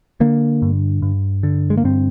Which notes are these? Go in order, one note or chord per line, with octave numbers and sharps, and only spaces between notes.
D3 A#3
G2
G2
D3
G#3
A#3
G2 C4